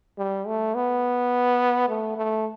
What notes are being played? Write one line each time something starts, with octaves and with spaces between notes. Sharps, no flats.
G3
A3
B3
A3
A3